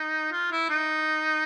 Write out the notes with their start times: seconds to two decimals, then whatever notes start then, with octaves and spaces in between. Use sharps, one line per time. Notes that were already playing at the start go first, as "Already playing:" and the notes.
Already playing: D#4
0.32 F4
0.51 E4
0.69 D#4